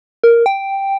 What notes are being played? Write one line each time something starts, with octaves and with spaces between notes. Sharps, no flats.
A#4
G5